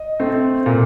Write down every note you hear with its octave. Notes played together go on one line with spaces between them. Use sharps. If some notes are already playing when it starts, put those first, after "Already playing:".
Already playing: D#5
A3 C4
A#2